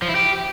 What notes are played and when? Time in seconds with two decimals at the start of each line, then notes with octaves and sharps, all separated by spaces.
0.02 F3
0.09 E4
0.15 G4